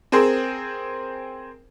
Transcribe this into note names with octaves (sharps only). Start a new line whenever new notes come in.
C4 G#4 A#4 C5